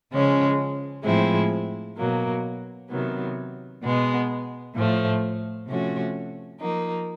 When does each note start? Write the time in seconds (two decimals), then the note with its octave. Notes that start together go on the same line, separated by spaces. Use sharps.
0.12 C#3 F3 G#3 C#4
1.04 A2 F3 G#3 C4 E4
1.97 B2 F#3 A#3
2.89 C3 D#3 F#3 B3
3.82 B2 G#3 B3
4.75 A2 F3 A3
5.68 C3 F3 A3 C#4 F#4
6.60 F3 A#3 D#4